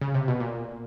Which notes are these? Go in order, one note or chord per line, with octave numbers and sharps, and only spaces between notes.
C#3
C3
B2
A#2